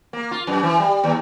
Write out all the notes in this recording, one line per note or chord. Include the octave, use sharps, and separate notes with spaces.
A#3
F4
F#2
E3
G3
D#2